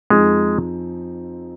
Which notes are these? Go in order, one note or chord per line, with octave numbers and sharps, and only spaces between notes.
F2 F3 G#3 C4 D#4 G#4